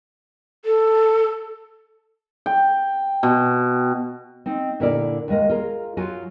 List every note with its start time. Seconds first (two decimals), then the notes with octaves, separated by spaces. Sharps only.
0.65 A4
2.46 G5
3.23 B2
4.46 C4 D#4
4.80 A#2 D3 E4 A#4 D5
5.28 D#2 G#3 A#4
5.49 F4 G#4 A#4
5.97 F#3 F4 F#4 G#5